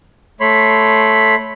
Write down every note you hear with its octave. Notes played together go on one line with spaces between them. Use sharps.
A3 C#5 B5 C6